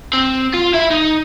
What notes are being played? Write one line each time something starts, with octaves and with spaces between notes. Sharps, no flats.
C4
F4
E4 E5
D#4